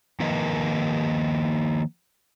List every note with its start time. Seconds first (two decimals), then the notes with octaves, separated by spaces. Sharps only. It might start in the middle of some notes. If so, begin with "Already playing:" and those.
0.20 D#3 F3 A#3 A#4 B4 D#5